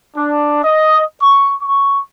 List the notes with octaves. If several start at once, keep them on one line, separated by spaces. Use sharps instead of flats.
D4
D#5
C#6
C#6